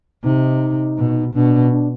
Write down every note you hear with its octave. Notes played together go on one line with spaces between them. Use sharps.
C3 D#4
B2
B2 D4
D4